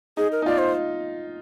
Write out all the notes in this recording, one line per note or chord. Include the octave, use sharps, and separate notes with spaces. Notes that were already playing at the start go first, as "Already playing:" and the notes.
D#4 G#4
A#4
D#4
F4 D5
C5